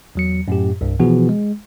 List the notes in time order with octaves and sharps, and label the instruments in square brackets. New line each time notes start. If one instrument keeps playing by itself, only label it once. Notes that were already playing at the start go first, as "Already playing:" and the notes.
[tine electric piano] E2 F#3 C#7
F#2 A2 G4
C2 G2
B2 E3 F3 B3 F#4 G#4
G#3